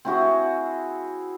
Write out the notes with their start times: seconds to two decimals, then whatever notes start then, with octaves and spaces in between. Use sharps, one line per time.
0.05 C4 E4 F#4 G#4